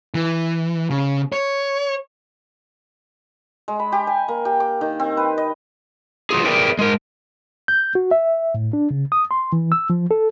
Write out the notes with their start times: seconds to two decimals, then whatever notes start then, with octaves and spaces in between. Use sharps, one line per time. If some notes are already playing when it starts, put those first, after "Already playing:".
0.14 E3
0.90 C#3
1.32 C#5
3.68 G#3
3.79 B5
3.92 G4
4.07 G#5
4.28 A#3
4.45 G4
4.60 D6
4.81 D#3
5.00 C4
5.17 B4
5.38 D#5
6.30 F#3 F4 G#4
6.44 G#4 A#4 B4 D5 E5 G5
6.79 G#3 A#4
7.68 G6
7.95 F#4
8.11 E5
8.55 A2
8.73 D4
8.91 C#3
9.12 D#6
9.31 C6
9.53 E3
9.72 E6
9.90 F3
10.11 A4